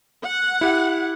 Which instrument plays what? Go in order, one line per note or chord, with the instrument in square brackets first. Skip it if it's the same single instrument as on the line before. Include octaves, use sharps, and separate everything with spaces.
[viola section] F#5
[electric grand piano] E4 G4